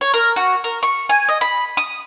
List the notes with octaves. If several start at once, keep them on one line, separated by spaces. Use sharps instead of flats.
C#5
A#4
F#4
A#4
C#6
G#5
D#5
B5
D#6